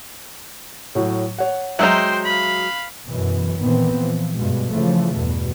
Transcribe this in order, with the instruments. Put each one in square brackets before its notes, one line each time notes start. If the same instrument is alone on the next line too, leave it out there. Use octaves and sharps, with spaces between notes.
[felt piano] A2 F#3
C#5 F#5
[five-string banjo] F#3 G#3 A#5 [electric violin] C5 G5 [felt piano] E5 E6
[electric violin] F5 B5
[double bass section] F#2 B2 E3
A#2 D#3 E3 B3 C4
E3 F3
G2 B2 G#3
C#3 E3 F3 A3
E2 G2 B2